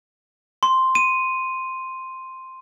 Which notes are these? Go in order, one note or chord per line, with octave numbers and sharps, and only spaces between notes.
C6
D#7